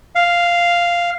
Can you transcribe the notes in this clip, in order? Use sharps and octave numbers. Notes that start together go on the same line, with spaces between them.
F5